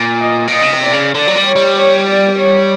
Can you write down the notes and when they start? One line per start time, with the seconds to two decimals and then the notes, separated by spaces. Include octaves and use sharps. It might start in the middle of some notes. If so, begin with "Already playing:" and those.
Already playing: A#2
0.21 D#5
0.48 B2
0.52 A#2 D#5
0.63 C#3
0.74 C3
0.84 D5
0.93 C#3
1.15 D3 D5
1.27 F#3
1.36 G3
1.46 C#5
1.56 G3
1.77 C#5
2.08 D5
2.39 C#5